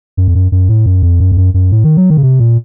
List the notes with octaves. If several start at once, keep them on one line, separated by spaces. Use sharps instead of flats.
F#2
F2
F#2
F#2
A2
F#2
F2
F#2
F2
F#2
F#2
A2
D#3
F#3
D#3
C#3
C3
A#2